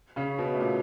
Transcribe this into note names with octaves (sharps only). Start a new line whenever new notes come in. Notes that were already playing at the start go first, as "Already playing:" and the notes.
C#3 C#4
B2 B3
A3
A#2 A#3